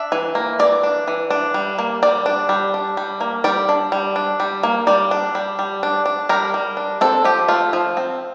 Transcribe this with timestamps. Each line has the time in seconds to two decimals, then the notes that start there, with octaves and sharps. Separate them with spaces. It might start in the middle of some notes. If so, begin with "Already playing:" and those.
Already playing: D4 E5
0.12 E3
0.35 A#3
0.59 E3 D5
0.83 D4
1.08 E3
1.30 D4
1.54 G3
1.78 A#3
2.03 G3 D5
2.26 D4
2.49 G3
2.74 D4
2.97 G3
3.21 A#3
3.44 G3 D5
3.69 D4
3.92 G3
4.16 D4
4.40 G3
4.63 A#3
4.87 G3 D5
5.11 D4
5.35 G3
5.59 G3
5.83 D4
6.06 D4
6.29 G3 A#4
6.54 G3
6.77 D4
7.01 C4 A4
7.24 F3 G4
7.48 A3 F4
7.73 F3
7.97 C4